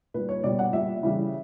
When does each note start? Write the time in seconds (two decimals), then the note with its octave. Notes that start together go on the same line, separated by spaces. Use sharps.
0.14 A#2 G3 B4
0.29 C#5
0.44 B2 G3 D5
0.59 F#5
0.73 A#2 G3 E5
1.03 C#3 E3 G3